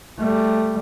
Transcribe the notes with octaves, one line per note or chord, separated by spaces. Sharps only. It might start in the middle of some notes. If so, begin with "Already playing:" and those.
G3 A3